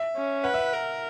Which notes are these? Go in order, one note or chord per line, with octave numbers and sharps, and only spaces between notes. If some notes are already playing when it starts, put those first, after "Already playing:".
Already playing: E5
C#4
B4 F#5
E5
F#5
A#4